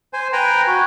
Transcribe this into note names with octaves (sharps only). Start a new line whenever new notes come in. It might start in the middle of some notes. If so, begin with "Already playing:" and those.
C5 G#5
B4 G5 G#5 A#5
F#4